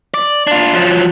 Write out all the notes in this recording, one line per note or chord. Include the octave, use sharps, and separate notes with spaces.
D5
D4 F4
F3 F#3